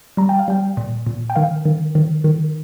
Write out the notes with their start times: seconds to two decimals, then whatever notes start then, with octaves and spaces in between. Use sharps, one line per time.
0.17 G3 A#5
0.29 G5
0.39 F5
0.48 G3 G5
0.77 A#2
1.06 A#2
1.30 G5
1.36 D#3 F5
1.65 D#3
1.95 D#3
2.24 D#3